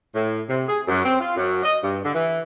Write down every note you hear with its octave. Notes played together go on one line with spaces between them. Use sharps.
A2
C3
G#4
F#2
C4
F4
F#2
D#5
G2
D3
E3